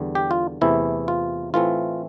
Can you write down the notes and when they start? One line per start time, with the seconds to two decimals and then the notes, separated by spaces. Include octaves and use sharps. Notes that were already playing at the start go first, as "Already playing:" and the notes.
Already playing: E2 D3 G3
0.15 G4
0.31 F4
0.61 E2 C3 E3 A3 E4
1.08 F4
1.54 A2 E3 A3 C4 F4